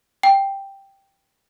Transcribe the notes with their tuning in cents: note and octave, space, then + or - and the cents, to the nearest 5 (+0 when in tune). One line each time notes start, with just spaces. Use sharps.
G5 +0